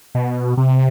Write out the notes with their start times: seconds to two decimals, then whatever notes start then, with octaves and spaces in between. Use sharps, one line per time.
0.15 B2
0.57 C3